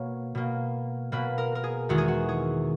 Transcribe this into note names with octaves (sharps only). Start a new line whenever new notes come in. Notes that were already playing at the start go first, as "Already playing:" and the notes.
Already playing: B2 A#3 C#5
B2 A#3
B2 A#3 B4
A#4
A#4
G#4
E2 D#3 G#3 F#4
G#4
F#4
G#4